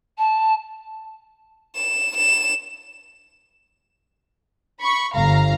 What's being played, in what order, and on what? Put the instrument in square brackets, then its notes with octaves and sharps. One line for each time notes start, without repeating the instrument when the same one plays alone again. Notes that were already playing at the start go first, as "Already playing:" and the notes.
[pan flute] A5
[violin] E7
E7
[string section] B5 C#6
G1 F5 A#5